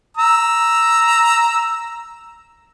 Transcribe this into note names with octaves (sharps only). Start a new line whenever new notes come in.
A#5 E6